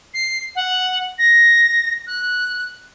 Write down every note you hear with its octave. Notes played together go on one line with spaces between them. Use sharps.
C7
F#5
A#6
F#6